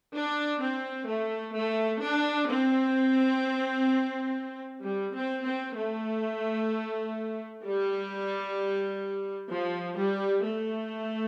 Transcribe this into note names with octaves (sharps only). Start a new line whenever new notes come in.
D4
C4
A3
A3
D4
C4
G3
C4
C4
A3
G3
F3
G3
A3